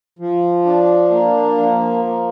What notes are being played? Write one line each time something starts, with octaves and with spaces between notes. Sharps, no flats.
F3
D4
A#3
F3
A#3